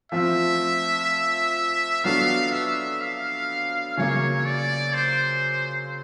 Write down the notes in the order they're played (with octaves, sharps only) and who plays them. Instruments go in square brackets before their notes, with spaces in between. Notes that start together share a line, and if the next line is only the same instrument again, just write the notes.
[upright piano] F3 A3 C4 F4 [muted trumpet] E5
[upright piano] F#3 B3 D4 F#4 A4 [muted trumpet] F5
[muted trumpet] E5
F5
[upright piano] C#3 F#3 A#3 [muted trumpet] C#5
[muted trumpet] D5
C5